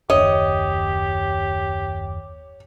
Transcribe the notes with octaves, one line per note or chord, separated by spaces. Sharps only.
F#1 D#2 G4 C#5 D#5